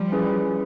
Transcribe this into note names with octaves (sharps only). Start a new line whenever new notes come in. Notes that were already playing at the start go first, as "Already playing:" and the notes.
Already playing: F3 G3
C#4 E4 G#4 B4